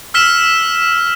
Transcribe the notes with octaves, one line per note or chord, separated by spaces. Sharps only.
E6 F6 B6 E7